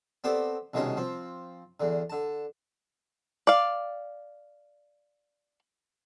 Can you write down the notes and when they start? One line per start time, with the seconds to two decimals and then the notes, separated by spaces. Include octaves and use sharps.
0.24 B3 C4 G4 A4 C5 D5
0.74 C2 B2 D#3 G#3 C#4 A5
0.97 F3 C4
1.80 E2 D3
2.10 D3 A5
3.47 D5 F5